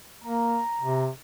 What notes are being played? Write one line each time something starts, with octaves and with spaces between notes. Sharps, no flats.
A#3 A#5
C3